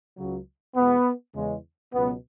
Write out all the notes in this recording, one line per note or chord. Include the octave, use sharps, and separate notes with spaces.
C#2 C#3 F#3
E2 B2 G#3 B3
E2 C#3 G#3
C#2 B2 F#3 B3